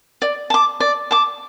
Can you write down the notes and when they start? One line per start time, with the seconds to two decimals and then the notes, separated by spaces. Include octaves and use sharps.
0.22 D5
0.50 A5 D6
0.80 D5
1.11 A5 D6